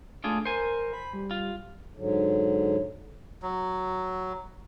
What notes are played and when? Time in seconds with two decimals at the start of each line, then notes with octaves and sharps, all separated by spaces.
0.24 A3 D4 F4 G#4
0.45 A#4 C5 G#5
0.93 B5
1.13 G3
1.31 F4
1.97 G#2 D3 F#3
3.42 F#3